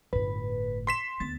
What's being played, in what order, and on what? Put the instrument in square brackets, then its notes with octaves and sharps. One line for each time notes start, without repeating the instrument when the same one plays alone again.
[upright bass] G1 A2 [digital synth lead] B4
[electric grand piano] C6 B6 E7
[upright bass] D2 B3 [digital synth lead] A6